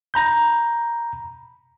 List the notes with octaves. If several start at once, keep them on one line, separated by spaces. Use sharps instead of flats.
A#5 B5 G6